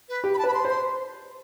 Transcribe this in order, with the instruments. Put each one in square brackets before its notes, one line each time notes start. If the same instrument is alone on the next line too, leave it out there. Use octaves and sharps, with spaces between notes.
[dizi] B4
[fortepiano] G4
[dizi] B5
A5
[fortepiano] B4
[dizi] B5
C6
[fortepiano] C5
[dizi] C6